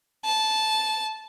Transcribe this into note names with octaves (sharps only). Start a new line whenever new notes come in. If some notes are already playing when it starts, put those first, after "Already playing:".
A5